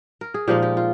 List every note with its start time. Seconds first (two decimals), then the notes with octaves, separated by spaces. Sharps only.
0.21 A#4
0.34 G#4
0.48 A#2 F3 G#3 D#4 G4
0.62 G4
0.77 F4